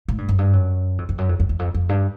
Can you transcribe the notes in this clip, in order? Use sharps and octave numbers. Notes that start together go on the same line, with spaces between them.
A2
G2
F#2
G2
F#2
F2
F2
F#2
F2
F2
E2
F2
F2
G2